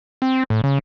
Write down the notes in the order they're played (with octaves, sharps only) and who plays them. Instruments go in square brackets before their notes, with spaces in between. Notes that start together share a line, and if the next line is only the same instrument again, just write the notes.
[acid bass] C4
A2
C#3